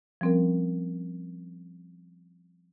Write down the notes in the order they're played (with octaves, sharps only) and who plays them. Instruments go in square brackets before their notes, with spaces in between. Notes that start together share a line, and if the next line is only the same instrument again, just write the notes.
[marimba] F3 G3 C4 C#4 A#4